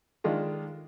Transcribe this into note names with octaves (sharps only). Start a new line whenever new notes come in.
D#3 G#3 D4 F4